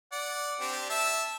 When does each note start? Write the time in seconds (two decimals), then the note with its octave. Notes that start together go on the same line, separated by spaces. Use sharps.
0.12 D5 F#5
0.60 C4 D4 G4
0.90 E5 A5